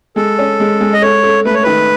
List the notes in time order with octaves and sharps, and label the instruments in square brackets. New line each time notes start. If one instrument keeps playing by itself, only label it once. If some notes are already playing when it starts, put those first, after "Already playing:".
[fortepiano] G#3 [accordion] A4
[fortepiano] C#4
G#3
G#3
[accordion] D#5
[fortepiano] A4 [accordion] C#5
[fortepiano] A4
[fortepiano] A3 [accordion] B4
[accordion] C#5
[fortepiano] D#3 [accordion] B4